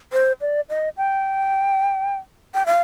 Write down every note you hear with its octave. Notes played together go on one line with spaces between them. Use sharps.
C5
D5
D#5
G5
G5
F5